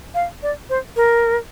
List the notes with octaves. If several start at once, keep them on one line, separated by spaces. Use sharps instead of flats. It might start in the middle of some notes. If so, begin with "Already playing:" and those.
F5
D5
C5
A#4